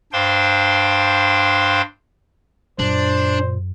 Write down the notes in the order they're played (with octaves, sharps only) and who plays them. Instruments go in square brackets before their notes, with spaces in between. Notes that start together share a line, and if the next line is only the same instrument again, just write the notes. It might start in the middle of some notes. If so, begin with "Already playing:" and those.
[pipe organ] G2 D4 C5 F5 G5 C6
[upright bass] F#2 [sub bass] A#2 [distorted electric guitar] D4 [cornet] C5